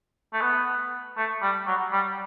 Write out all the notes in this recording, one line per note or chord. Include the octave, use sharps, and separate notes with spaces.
A3
B3
A3
G3
F#3
G3